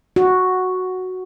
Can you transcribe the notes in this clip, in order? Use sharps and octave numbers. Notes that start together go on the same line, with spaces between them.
F#4